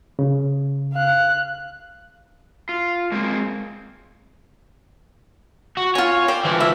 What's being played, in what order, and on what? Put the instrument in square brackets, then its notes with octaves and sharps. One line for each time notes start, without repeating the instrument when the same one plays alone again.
[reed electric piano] C#3
[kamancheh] F5 F#6
[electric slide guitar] F4
G#3 A#3 C4 C5
[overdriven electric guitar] F#4
[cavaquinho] F4 G#5 [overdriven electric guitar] C#5
[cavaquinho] C5 D5 G5
[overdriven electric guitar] E3 F3
[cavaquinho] E5